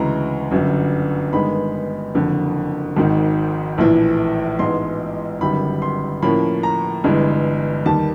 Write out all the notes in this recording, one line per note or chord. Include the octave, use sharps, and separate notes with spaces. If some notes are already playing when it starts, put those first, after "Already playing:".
Already playing: D2 C#3 E3 G#3 A#5
G1 F#2 D3
G2 D#3 G#3 B3 B5
F#1 F2 D3
G#1 G#2 D#3
A#1 A2 E3
A1 G#2 E3 G#3 B3 C6
G1 F#2 D#3 G3 B5
C6
A2 F3 A#3 C#4 B5
A#5
G1 G2 E3 G#3
D#2 D#3 G3 A5